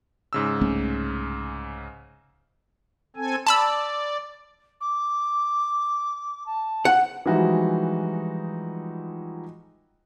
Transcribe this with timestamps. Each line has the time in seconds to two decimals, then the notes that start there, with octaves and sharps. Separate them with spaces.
0.33 G#2 C#3 E6
0.61 C2 A3 C#4
3.16 C4 A4 G#5
3.47 D5 A5 B5 E6
4.80 D6
6.46 A5
6.85 F#5
7.26 E3 F3 G3 G#3 D#4 F#4